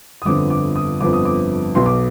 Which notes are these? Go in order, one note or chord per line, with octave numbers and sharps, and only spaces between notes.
D#6
G1 F2 D3 F3 B3 D6
D6
D#6
G1 F2 D3 F3 B3 D6
D#6
D6
B1 B2 B3 C6
D6